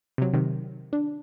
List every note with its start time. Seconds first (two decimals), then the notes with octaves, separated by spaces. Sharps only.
0.18 C3 F#3
0.33 C3 D#3
0.93 D4